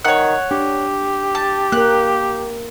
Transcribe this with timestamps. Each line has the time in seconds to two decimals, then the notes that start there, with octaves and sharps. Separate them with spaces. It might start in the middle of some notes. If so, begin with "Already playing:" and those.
0.05 D#3 C#5 F#5
0.51 D4 G4
1.35 A5
1.72 A#3 A#4 F#6